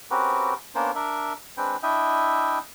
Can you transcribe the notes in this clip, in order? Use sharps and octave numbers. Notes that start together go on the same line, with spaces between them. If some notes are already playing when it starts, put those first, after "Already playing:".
C4 C#4 F#4 G4 A#4 B4
A#3 B3 C#4 D4 A#4 C5
D4 A#4 E5
G#3 C4 D4 B4 G5
D4 E4 D#5 E5 G5